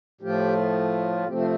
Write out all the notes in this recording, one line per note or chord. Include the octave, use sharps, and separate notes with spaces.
A2 F3 A3 F4 G4
C3 F3 A3 C4 G4
C5